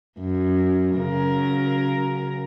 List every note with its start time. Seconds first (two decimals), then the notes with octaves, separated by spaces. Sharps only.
0.19 F#2
0.96 C#3 F#3 A#4